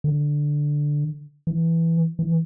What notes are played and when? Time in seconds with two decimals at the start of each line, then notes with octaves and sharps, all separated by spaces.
0.04 D3
1.47 E3
2.19 E3